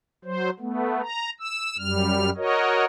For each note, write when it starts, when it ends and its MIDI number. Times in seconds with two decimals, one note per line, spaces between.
0.25 0.50 54
0.25 0.50 72
0.60 1.02 57
0.60 1.02 59
1.02 1.30 82
1.40 1.77 88
1.78 2.30 42
1.78 2.30 55
1.78 2.30 89
2.37 2.85 66
2.37 2.85 70
2.37 2.85 73
2.37 2.85 75